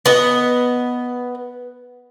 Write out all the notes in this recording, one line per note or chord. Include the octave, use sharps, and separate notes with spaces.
B3 D#5